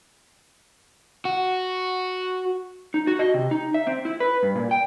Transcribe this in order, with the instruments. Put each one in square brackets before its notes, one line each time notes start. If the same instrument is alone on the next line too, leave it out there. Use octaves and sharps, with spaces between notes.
[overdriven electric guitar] F#4
[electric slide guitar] D#4
F#4
D#5
C3
D#4
E5
C4
E4
B4
G2
A#2
G5